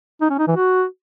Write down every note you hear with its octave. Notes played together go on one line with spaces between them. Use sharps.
D#4
C#4
D#4
E3
F#4